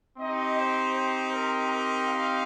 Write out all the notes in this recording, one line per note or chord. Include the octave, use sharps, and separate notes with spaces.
C4 D#4 G4 D#5
C5
C5
A#4
A#4
F5